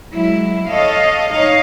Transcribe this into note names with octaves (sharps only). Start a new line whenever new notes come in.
F#3 G#3 E4
A4 C#5 D#5 F5
D#4 C#5 D#5 F5